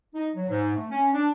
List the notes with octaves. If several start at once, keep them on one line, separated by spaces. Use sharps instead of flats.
D#4
F#3
G#2
A3
C#4
D4